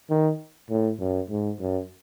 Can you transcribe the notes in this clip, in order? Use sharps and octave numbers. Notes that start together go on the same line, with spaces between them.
D#3
A2
F#2
G#2
F#2